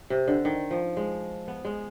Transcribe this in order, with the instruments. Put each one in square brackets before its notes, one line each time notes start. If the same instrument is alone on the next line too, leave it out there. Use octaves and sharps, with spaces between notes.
[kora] C3
D3
D#3
F3
G#3
B3
G#3